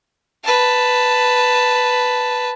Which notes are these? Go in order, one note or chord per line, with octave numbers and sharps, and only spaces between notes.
B4 A5